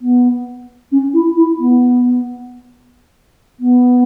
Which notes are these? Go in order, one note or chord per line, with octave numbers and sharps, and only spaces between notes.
B3
C#4
E4
E4
B3
B3